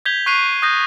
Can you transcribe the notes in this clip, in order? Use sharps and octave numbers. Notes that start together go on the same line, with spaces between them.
G6 G#6 B6 F7 G7
C#6 F#6 C7 D#7 F7
D#6 F#6 G6 A#6